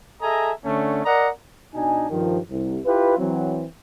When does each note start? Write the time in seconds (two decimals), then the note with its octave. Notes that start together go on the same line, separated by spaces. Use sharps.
0.22 G#4 A4 D#5 E5 G#5 A#5
0.65 D3 A3 C#4
1.05 A#4 D5 D#5 F#5 A#5
1.74 B2 D4 D#4 G#5
2.10 G2 D#3 F3
2.50 C2
2.86 E4 F4 G4 B4
3.18 E3 F#3 C4